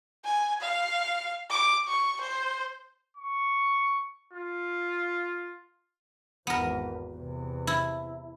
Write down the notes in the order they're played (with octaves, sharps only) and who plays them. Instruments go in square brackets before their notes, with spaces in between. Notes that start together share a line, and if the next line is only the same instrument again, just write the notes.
[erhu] G#5
F5
D6
C#6
C5
[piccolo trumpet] C#6
F4
[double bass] G#1 E2 [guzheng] B3 A#4
[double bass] E2 C3
[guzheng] E4